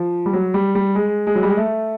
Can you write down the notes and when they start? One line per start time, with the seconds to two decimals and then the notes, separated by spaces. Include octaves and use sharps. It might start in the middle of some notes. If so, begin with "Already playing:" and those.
Already playing: F3
0.26 G3
0.33 F#3
0.54 G3
0.75 G3
0.95 G#3
1.27 G#3
1.35 F#3
1.43 G3
1.50 G#3
1.57 A3